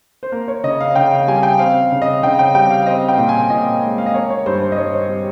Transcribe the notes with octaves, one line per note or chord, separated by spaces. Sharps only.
C5
A#3 A#4
C#5
C#3 D#5
F5
C#3 G5
F5
G3 G#5
G5
C4 F5
C#3
D#5
C#3 G5
G5
G3 G5
F5
C4 D#5
F5
G5
A#2
G#5
A#2 D#5
G#3
F5
D#5
A#3 C#5
C#5
G2 C5
C5
D#5
G2 C#5
C5
G3